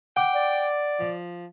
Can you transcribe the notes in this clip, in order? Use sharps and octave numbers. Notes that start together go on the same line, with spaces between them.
F#5 G5 D6
D5
F3